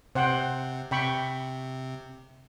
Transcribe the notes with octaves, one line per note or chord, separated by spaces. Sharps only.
C3 C5 F#5 G5
C3 G5 B5 C#6